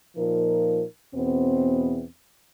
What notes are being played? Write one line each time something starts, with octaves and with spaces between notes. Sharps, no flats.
A#2 F3 D#4 A#4
E2 B2 B3 C4